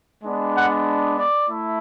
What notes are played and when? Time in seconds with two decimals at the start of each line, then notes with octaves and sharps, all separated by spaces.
0.23 G#3 B3 D4
0.55 F#5
1.18 D5
1.49 A3 E4